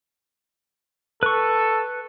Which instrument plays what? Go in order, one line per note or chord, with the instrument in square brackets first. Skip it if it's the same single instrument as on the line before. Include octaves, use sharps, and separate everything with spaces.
[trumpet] A4 [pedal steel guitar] B4 C#6